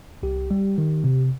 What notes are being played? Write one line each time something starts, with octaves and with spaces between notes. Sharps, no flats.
C2 G4
G3
D#3
C3